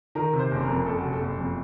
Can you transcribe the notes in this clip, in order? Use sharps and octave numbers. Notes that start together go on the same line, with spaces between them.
D#3 A#4
C3
C5
F#1
A#4
F2
F#1 A4
C3 F#4
A4
F#1
F2